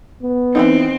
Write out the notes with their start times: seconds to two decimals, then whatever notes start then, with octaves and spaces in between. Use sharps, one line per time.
0.22 B3
0.55 E3 F3 C4 D#4